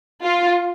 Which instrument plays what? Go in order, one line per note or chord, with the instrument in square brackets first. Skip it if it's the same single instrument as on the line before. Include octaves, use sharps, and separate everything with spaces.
[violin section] F4